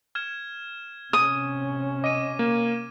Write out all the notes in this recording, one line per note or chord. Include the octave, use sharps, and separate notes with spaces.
F6 G#6 E7
C3 C#4 D#6
D#5 D6 D#7
A#3